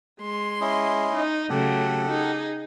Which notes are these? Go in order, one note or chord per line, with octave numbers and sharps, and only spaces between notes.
G#3 C6
C#4 E4 D#5
D#4
C#3 F#3 A3 G4 A4 F#5
D#4 G#4